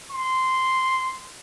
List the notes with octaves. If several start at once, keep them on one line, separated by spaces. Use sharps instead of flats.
C6